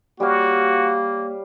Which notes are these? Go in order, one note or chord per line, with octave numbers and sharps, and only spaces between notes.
G3 A#3 F#4 C#5 F5